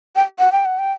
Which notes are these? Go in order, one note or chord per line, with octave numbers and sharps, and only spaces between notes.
G5
F#5
G5
F#5
G5